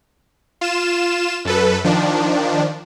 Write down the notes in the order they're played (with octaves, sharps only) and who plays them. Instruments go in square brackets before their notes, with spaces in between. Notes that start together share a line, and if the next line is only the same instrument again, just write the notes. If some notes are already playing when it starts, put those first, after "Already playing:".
[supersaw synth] F4 E7
F#2 A4 B4
D#3 F3 D4